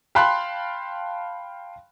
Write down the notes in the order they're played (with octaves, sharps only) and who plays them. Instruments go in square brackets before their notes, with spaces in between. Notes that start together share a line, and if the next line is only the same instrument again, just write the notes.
[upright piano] F5 G5 A5 B5 C6 F#6